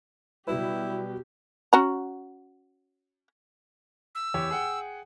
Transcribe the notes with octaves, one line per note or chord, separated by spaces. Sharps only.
B2 F#3 G3 E4 G4 B4
C#4 F#4 A#5
E6
E2 G4 C#5
G#4 F#5 G5